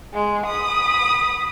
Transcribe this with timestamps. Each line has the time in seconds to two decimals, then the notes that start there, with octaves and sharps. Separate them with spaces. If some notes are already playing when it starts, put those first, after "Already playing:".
0.13 G#3
0.46 B5 D#6